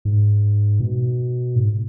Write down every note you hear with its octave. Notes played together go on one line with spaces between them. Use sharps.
G#2
B2
G#2